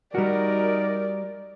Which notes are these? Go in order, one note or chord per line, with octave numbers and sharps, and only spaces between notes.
G3 D#4 F#4 A#4 D5